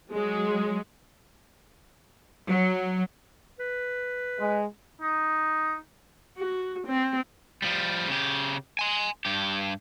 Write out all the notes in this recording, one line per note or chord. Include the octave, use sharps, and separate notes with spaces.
F#3 G#3
F#3
B4
G#3
D#4
F#4
C4
F3 G3
C#3 G4
G#5 C6
G2 G4